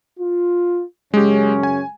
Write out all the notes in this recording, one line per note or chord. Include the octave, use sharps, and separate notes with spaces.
F4
F#2 C#3 G#3 C#4 G4
G#5